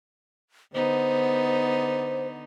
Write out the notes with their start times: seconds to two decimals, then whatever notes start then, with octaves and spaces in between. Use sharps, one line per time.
0.74 D3 B3 D#4 C5